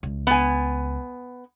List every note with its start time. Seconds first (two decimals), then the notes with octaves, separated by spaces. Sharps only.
0.03 C#2
0.27 B3 G#5